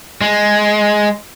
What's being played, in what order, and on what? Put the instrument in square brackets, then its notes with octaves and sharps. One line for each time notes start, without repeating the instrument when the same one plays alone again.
[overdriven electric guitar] G#3